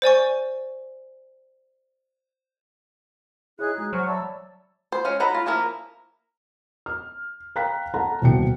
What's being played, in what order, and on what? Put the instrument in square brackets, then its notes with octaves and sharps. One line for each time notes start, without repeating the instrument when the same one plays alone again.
[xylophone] C5 D5 G#5 C#6
[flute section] D#4 F#6 [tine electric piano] E4 C#5 D#5 [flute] G#4
[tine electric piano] G#3 F#4 [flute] G#4
[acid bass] F#3 [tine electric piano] C5 G#5 F6 [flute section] F#5 C#6
[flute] C#5 [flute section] D5 E6 [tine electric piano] E5 A5 B5
[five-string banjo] C5
G#3 C#4 F5
D#4 F#4 A4 A#5 B5
F4
F3 A#3 E4 A#4 A#5
[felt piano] F6
F5 G5 A#5 F#6 B6
A4 F#5 A5 A#5
D#1 C2 B3 F#4 G5 C#7